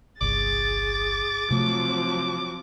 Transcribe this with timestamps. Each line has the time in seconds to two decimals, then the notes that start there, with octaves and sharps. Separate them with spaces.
0.21 G1 C2 G#4 D6 A6
1.51 C3 F3 F#3 A3 C4